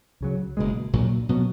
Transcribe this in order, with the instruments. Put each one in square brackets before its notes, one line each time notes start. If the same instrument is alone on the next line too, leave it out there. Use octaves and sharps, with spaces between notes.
[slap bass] C#2 C#3 F#3
F#1 E2 B2 G#3
A#1 A#2 F#3
B2 F#3 B3